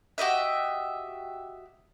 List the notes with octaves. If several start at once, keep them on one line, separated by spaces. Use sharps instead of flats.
F#4 G4 D#5 E5